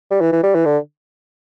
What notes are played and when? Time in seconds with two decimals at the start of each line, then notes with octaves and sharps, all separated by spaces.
0.11 G3
0.21 E3
0.32 E3
0.43 G3
0.55 E3
0.66 D3